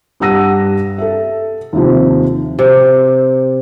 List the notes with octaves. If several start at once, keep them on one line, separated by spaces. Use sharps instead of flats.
G2 G4 F#5 E6 A#6 D#7
A4 E5
D#2 C3 F3
C3